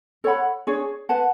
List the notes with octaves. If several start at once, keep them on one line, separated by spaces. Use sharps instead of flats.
A4 C#5 F#5 B5
D4 G#4 C#5
B4 F#5 A5